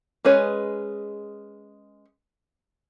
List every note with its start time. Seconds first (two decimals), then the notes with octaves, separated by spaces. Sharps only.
0.25 G#3 C#4 G#4 B4 C#5